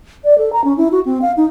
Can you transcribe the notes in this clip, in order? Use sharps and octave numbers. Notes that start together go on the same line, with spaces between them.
D5
A4
A#5
C#4
E4
F#4
C4
F5
D#4